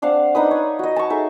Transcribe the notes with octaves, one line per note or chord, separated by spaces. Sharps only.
C4 D4 F5 F#5
D4 D#4 B4 D#6
C#5
F#4 D#5
A5 C#6
D#4 G#4 A4 E5